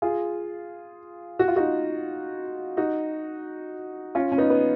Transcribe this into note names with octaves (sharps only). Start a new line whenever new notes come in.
F4 G#4
F#4
F4
D#4 F#4
D#4 F#4
C#4 F4
C#4
B3 D#4
B3